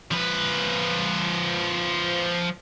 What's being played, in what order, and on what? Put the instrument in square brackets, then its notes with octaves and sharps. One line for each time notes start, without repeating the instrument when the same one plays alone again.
[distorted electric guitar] F3 B4